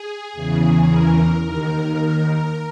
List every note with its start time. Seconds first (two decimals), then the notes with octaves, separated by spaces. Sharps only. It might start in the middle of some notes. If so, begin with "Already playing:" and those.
Already playing: G#4
0.33 E2 C#3 E3
0.89 A#4
1.44 D#2 D#3 A#4